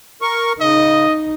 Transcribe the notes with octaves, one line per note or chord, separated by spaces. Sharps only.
A#4 C#6
C#3 D#4 D#5